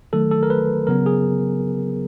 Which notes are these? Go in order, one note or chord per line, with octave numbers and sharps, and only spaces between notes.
D#3 F#3 A3 A4
A4
A#4
B4
C#3 F#3 B3 A#4
G#4